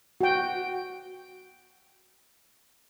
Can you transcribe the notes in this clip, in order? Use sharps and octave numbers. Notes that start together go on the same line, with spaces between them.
F#4 G5